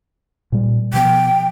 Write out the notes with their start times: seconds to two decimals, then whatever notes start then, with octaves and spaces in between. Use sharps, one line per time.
0.52 A#2 G3
0.93 B2 F3 B3 G5